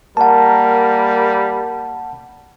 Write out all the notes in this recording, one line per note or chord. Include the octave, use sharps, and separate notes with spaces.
G3 A#3 A#4 F#5 A5